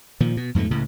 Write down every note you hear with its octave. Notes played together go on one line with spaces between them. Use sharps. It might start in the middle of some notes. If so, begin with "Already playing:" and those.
A#2 D#3 F3
B2
F2 G#2 B2 A3
C#2 A2 C#3